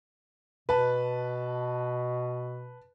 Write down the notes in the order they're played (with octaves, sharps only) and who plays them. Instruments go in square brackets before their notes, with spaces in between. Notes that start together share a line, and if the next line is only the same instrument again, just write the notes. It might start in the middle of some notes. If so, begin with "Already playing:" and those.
[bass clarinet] B2 [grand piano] B4 A5